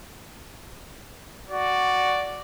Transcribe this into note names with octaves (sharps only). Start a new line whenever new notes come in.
F#4 D5